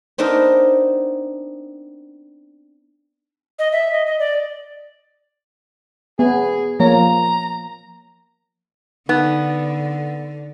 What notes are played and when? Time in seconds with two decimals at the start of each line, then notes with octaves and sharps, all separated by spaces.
0.18 B3 C4 D4 D#4 A#4
3.59 D#5
3.72 E5
3.93 D#5
4.06 D#5
4.19 D5
6.19 B3 G#4
6.80 F3 A#3 C#5 A#5
9.09 D3 B3 D#4